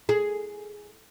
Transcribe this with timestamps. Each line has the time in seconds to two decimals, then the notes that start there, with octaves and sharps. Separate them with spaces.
0.09 G#4